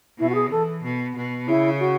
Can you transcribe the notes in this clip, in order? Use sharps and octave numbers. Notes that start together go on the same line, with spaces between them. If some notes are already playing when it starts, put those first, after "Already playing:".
B2 E4
F#4
G#4
E3 A4
B2
B2
C#3 E4
F#4